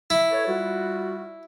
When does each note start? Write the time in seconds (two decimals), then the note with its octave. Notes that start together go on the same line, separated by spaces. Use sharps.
0.10 E4
0.30 A4 B4 C#5
0.47 G3 F4 F#4